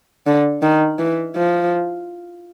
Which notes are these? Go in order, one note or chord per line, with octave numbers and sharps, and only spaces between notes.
D3
D#3
E3
F3